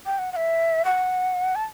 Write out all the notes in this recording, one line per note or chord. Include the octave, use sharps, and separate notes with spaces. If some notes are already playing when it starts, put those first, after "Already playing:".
G5
F#5
F#5
E5
F#5
A5